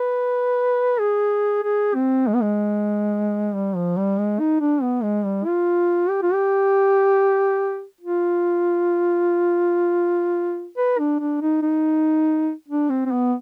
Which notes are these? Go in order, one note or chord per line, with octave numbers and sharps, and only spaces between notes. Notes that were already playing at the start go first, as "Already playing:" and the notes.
Already playing: B4
G#4
G#4
C4
G#3
B3
G#3
G3
F3
G3
G#3
D#4
D4
B3
G#3
G3
F4
G4
F4
G4
F4
B4
D4
D4
D#4
D#4
D4
C4
C4
B3